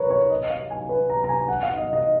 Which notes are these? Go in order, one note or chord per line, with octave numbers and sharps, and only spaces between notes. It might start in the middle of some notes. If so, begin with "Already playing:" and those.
Already playing: A#4 B4 C#5
C#5
D#5
F5
G#5
B4
A#5
A#5
G#5
F#5
F5
D#5
D#5